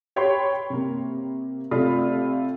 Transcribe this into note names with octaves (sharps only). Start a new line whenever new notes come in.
G4 C#5 G5 B5 C6
C3 A#3
C3 A3 F4 D5 F5 B5